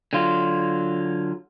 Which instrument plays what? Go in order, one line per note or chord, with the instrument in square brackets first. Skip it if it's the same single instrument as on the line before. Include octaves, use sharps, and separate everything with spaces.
[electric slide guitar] D3 F#3 F4